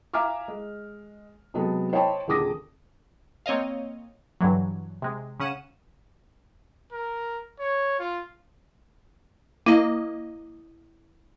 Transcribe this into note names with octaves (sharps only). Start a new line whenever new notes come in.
E5 F5 G#5 A#5 D6 F6
G#3
C3 F#3 G#3 B3 A4
C5 C#5 D#5 G5 A5 B5
D#1 D3 G#4 D6 D#6 A#6
A#3 C4 C#5 D#5 F5
G2 D3 E3 F#3
C3 G#3
C#3 C#4 F#5 D#7 E7
A#4
C#5
F4
A#3 E4 D#5